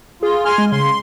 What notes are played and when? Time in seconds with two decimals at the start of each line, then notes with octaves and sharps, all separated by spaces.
0.23 F4 G#4
0.45 G#5 C6 F6
0.58 G#3
0.72 C#3 C6